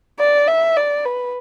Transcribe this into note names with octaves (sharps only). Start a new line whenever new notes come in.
D5
E5
D5
B4